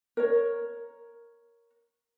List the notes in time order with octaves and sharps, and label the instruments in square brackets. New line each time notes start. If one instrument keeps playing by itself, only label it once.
[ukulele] A#4 C#5